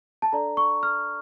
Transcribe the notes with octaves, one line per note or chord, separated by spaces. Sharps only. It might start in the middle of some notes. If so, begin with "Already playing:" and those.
A5
D4 A4 D5 A#5
C#6
F6